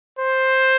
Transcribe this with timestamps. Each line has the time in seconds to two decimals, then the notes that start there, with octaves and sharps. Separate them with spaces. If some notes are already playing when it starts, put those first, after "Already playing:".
0.19 C5